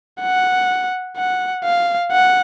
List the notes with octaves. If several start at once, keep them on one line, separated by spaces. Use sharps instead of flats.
F#5
F#5
F5
F#5